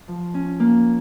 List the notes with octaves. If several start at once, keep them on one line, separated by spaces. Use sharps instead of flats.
F3
C#4
A#3